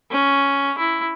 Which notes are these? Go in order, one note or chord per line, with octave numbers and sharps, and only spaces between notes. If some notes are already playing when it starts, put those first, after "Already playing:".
C#4
E4